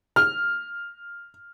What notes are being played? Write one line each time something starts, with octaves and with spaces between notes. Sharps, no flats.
F6